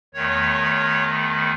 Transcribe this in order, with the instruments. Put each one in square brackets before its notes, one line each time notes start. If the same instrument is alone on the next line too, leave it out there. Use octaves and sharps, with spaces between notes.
[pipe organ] E2 D#3 A3 C#5